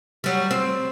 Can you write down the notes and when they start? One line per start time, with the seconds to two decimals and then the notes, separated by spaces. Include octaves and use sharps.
0.24 F#3 G3
0.51 C4